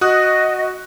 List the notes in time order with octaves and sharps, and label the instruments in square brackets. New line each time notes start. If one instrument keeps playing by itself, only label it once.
[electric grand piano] F#4 D#6 F#6 [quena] D#5